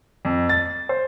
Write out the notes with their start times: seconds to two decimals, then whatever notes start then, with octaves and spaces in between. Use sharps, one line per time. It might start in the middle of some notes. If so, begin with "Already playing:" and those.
0.25 F2
0.49 A6
0.89 C5